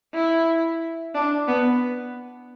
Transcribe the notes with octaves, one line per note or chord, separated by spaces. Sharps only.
E4
D4
B3